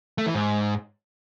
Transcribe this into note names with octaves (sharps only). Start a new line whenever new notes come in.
A3
E3
G#2